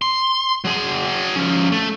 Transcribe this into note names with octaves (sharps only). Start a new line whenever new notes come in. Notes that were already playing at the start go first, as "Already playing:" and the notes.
C6
F#3 G#4
F3 C#4
A3